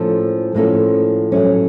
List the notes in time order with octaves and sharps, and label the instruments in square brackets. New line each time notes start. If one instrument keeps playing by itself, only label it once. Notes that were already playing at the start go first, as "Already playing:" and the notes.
Already playing: [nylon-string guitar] A2 F3 A#3 C#4 A4
A2 F3 A#3 C#4 A4
A2 F#3 A3 C#4